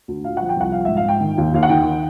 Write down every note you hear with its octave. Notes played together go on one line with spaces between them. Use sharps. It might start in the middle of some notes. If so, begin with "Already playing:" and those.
D2
A#2 F5
F3 F#5
G5
C2 F#5
F3 F5
G#2 E5
F5
G#2 G5
D#3
D#2
D#2 F5
F#5
D#3 G5